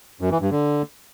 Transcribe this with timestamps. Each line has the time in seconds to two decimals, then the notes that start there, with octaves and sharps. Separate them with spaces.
0.21 F#2
0.31 E3
0.41 G2
0.51 D3